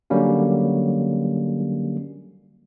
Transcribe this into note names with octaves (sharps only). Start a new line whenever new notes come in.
D3 F#3 G3 A#3 C#4